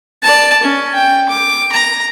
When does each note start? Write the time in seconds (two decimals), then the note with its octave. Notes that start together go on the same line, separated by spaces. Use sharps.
0.22 D5 A5
0.62 C#4
0.94 G5
1.29 D6
1.72 A#5